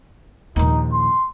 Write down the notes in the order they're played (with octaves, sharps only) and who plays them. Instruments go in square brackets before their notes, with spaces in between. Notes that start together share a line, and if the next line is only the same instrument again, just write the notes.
[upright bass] A#1 D#2 [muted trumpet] D#4
[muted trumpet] C6